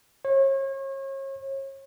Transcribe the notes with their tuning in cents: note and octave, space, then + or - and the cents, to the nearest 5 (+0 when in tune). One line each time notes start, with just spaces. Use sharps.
C#5 -35